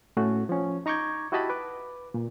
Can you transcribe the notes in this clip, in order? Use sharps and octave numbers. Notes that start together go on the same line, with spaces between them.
A2 A3 C#4 F#4
F3 C#4
D#4 A#5 C#6 D6 G6 G#6
E4 F#4 G4 D#5 A5 B5
B4 D6
A#2